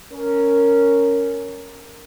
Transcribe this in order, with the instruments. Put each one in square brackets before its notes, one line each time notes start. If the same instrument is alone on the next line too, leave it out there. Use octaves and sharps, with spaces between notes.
[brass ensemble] C#4 A#4